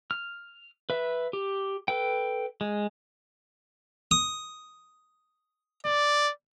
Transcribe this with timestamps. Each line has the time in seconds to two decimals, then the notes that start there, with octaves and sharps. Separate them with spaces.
0.11 F6
0.90 B4 E5
1.33 G4
1.88 A4 B4 G5
2.61 G#3
4.11 D#6
5.85 D5